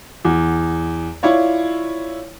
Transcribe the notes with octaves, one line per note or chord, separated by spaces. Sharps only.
E2
E4 F4 C#5 D5